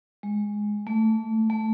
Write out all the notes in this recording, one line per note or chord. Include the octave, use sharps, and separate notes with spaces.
G#3
A3
A3